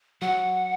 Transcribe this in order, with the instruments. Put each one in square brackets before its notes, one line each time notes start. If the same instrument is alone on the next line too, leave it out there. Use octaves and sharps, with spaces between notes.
[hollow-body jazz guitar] F#3 [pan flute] F#5